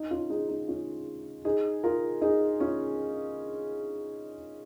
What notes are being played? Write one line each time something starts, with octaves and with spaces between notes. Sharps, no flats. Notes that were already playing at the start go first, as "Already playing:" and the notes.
Already playing: D#4
C#4 F4
D#4 G#4
D#4
C#4 F4
D#4 G#4
F4 A#4
D#4 G#4
C#4 F4